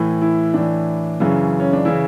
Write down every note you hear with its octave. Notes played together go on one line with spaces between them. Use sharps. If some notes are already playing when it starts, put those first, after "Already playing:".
Already playing: A2 E3
E4
A2 E3 D4
F#2 C#3 E3
C#4
D4
C#3 E3 E4